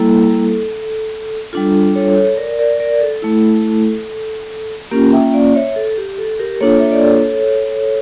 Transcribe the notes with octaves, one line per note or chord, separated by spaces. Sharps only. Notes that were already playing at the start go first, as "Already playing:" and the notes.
Already playing: G3 A#3 E4 A4
G3 D4 F4 A4
A4 C#5
A#4 D5
A#4 D5
A#4 D5
A4
A3 E4
A#3 C#4 F4 G4 A#4
E5 G5
D5 F5
C#5 E5
A4
G4
A4
G4 A#4
A#3 D4 F4 A4 C#5
E5
D5
A4 C#5